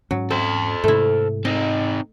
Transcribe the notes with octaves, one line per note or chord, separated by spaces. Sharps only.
G#2 F#3 C#4
C4 A4 C5
G#2 C3 A3 E4
C4 D#4 D#5